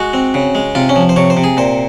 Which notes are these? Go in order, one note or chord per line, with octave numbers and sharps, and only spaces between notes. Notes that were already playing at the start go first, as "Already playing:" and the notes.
Already playing: G#3 F#4
C4
C#3
G#3
C3 F4
C#4
F3
C5
C3 C#5
C5
C3
G#4
A#2 C5